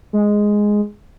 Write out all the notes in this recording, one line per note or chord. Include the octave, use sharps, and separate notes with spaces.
G#3